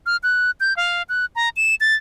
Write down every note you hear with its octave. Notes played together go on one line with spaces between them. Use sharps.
F6
F#6
G6
F5
F#6
A#5
E7
A6